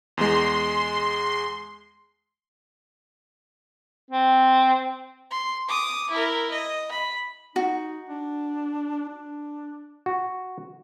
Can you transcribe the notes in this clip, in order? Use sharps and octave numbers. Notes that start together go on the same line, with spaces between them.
E2 G#3 C6
C4
C6
D6 D#6
E4 A#4
D#5
B5
D#4 F#4
D4
D4
F#4